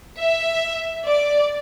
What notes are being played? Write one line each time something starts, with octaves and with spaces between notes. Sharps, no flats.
E5
D5